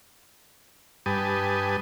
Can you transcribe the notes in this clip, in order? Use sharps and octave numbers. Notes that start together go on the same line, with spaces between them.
G2 G4 B4 G#5 A5 D#6